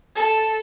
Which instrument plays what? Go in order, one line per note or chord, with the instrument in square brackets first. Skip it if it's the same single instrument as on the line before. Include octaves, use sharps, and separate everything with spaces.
[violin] A4